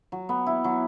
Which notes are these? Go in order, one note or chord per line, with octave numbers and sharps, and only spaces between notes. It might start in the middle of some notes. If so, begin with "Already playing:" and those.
F#3
B3
E4
F#3